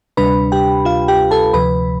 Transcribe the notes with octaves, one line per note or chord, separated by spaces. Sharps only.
D2 C3 G3 D4 B4 B5
G4 G5
F4 F5
G4 G5
A4 A5
D2 C3 F3 B4 B5